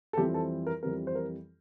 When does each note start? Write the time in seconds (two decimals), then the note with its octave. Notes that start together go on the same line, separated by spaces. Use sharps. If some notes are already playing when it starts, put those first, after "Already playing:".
0.13 A4
0.17 F2 E3 G3 C4 G4
0.34 A4
0.67 A#4
0.83 F2 E3 G3 C4 A#4
1.07 C5
1.15 A#4